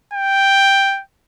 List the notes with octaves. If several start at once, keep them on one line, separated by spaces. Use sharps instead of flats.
G5